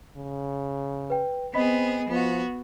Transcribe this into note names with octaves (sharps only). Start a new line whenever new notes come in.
C#3
B4 G5
B3 C4 G#4 D#5 B5 B6
F3 B3 F#4